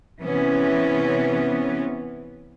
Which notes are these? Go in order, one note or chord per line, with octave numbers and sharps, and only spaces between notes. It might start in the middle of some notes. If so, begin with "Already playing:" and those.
C3 E3 B3 C#4